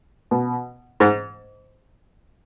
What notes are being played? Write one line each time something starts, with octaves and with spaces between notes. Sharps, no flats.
B2
G#2